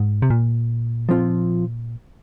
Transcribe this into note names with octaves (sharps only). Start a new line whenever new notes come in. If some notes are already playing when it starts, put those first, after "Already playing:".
Already playing: G#2
C3
A#2
F3 C4 F4